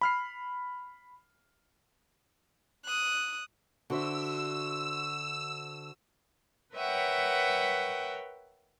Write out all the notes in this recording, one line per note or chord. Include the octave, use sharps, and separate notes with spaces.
B5 F6 C7
D#6 F#6
D3 F#4 C5 E5 E6
A#4 B4 C#5 E5 F#5 G5